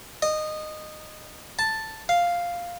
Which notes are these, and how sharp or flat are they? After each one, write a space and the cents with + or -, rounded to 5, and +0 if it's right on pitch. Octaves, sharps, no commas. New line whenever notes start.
D#5 -15
A5 +5
F5 +0